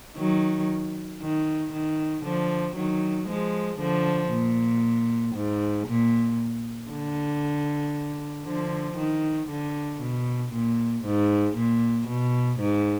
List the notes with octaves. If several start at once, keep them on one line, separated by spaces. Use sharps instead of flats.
D#3 F#3
D#3
D#3
D3 F3
D#3 F#3
F3 G#3
D3 F3
A#2
G#2
A#2
D3
D3 F3
D#3
D3
B2
A#2
G#2
A#2
B2
G#2